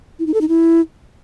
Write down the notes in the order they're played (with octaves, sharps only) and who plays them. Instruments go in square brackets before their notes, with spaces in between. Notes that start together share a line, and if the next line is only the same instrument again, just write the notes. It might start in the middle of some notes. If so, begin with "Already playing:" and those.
[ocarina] E4
D#4
A4
D#4
E4